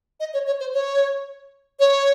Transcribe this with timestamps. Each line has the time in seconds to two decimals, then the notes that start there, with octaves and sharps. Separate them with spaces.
0.20 D#5
0.34 C#5
0.46 C#5
0.60 C5
0.74 C#5
1.79 C#5